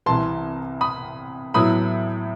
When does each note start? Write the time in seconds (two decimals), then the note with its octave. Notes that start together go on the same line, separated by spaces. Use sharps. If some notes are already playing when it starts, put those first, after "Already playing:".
0.06 C2 C3 E3 A5 C6
0.81 B5 D#6
1.54 A2 F#3 B3 E4 B5 D#6